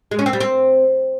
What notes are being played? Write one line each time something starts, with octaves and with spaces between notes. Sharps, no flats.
G#3
C#4
C4
G3
C4